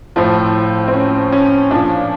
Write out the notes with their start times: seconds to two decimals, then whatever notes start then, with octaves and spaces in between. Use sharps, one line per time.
0.16 A2 F3 C4
0.88 C4
0.93 C#4
1.32 C#4
1.70 A#2 F3 D4